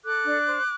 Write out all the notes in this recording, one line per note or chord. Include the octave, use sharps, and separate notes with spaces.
A4 D6 F#6
D4
C5